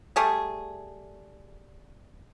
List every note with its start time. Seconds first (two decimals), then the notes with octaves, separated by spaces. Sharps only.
0.16 G3 A3 G#4